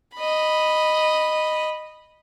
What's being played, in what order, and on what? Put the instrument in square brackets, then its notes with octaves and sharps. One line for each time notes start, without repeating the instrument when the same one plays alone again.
[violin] D#5 B5